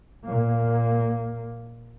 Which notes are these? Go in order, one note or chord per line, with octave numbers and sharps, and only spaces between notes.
A#2 A#3